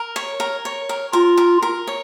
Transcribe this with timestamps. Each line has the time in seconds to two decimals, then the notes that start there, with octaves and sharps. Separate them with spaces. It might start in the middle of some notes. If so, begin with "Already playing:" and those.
Already playing: A#4
0.16 C#5
0.40 A#4
0.65 C#5
0.89 A#4
1.13 F4 A#4
1.37 A#4
1.62 A#4
1.87 C#5